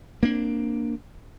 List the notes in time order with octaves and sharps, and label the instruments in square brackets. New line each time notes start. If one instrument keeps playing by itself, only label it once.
[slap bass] A#3 C4 D4